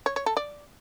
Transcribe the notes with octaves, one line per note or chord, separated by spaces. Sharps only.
C#5
C#5
A4
D5